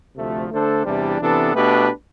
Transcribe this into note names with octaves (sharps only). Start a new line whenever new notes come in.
D2 C3 F3 A3
D3 A3 D4 A4 C5
E2 C3 E3 G3 D4
C3 E3 B3 D4 A4
B2 A3 D4 G4 B4